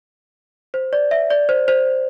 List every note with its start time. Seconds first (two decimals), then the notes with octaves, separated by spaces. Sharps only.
0.74 C5
0.93 D5
1.11 E5
1.30 D5
1.49 C5
1.68 C5